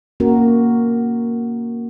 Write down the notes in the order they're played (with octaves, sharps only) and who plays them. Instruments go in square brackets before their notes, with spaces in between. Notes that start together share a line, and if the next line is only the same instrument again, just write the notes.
[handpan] A#3 C#4 F#4 A#4